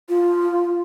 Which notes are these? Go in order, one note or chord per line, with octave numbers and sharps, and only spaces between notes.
F4